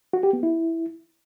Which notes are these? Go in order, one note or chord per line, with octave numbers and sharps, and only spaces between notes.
F#4
G4
B3
E4